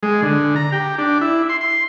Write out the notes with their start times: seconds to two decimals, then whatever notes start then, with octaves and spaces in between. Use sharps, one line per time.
0.03 G#3
0.22 D3
0.56 A#5
0.72 G4
0.98 D4
1.21 E4
1.49 C6
1.61 C6